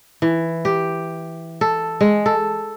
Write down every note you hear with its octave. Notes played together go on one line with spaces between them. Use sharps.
E3
G4
A4
G#3
A4